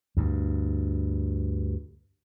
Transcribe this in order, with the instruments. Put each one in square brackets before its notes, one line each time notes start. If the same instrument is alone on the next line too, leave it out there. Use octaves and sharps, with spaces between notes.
[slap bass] D2 G2